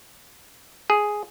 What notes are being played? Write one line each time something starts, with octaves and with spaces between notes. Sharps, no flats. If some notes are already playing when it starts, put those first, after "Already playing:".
G#4